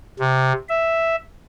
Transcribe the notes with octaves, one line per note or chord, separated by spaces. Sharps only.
C3
E5